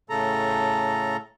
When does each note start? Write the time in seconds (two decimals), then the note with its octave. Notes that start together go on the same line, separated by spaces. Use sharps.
0.10 A2 C#3 A4 A#5